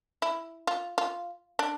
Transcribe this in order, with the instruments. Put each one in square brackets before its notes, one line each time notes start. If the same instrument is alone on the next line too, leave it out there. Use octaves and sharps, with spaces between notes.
[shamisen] E4
F4
F4
D4